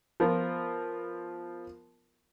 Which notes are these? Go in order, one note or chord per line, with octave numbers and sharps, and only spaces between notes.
F3 B3 F4 A#4